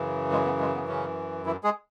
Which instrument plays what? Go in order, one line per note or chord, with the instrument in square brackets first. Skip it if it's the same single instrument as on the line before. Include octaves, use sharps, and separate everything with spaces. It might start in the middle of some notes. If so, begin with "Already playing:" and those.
Already playing: [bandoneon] F#2 C#3 E3
G#3
B3
G#3
B3
C#3 C#4
E3 E4
G#3 G#4